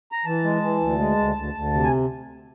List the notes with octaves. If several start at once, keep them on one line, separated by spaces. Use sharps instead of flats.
A#5
E3 A5
G#3
E3
D2
G#3
D2
D2
D2
C3
G#5